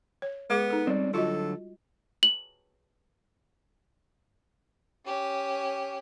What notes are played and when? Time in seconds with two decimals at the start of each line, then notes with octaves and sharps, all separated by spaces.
0.22 C#5
0.50 G#3 B3 G#4 D6
0.70 D#4 A4
0.87 G3 C4 C#4 D5
1.14 D3 F#3 F4 F#4 A4 D#5
2.23 F#7
5.06 C#4 G4